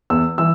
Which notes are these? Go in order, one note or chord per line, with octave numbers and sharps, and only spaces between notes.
E2 E6
E3 E6